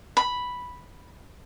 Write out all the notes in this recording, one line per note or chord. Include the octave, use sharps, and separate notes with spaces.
B5